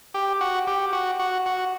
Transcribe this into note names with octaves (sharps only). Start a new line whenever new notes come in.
G4
F#4
G4
F#4
F#4
F#4